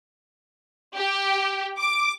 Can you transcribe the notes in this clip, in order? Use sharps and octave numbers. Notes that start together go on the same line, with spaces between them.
G4
D6